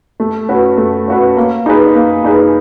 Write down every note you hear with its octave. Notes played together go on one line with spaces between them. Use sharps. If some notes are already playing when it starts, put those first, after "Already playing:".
A3
C#4 F#4 B4
A3
C#4 F#4 B4
A#3
D#4 G#4 B4
A#3
D#4 G#4 B4